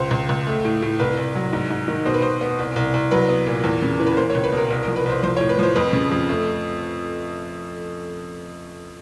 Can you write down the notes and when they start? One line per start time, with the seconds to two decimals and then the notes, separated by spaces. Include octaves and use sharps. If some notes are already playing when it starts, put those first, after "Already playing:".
Already playing: C#2 C5
0.11 C#2
0.29 C#2
0.47 A3
0.65 A2
0.82 A2
0.99 C2 B4
1.17 C2
1.35 F#3
1.53 G#2
1.70 G#2
1.88 D#3
2.05 B2 C5
2.14 B4
2.22 B2 C5
2.41 B3
2.59 C2
2.76 C2
2.94 C2
3.11 F#3 B4
3.29 B3
3.46 A#2
3.64 E2
3.82 C#3
4.00 E3
4.07 B4
4.17 A#3 C5
4.30 C#5
4.35 C#2
4.44 B4
4.52 B2 A#4
4.70 C2 A#4
4.83 A#4
4.87 F3
4.96 B4
5.06 C2 C5
5.23 F3 C5
5.37 C#5
5.41 A2
5.49 B4
5.59 F3 C5
5.75 F2 B4
5.93 C#3
6.11 F2
6.29 A3